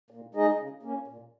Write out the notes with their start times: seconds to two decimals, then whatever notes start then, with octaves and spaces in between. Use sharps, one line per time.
0.10 A#2
0.35 G#3 D#4 G#4 D#5
0.59 C#3
0.83 A#3 C#4
1.07 A#2